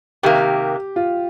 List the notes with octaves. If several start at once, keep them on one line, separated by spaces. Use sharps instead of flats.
C3 D#3 A#3 G4
F4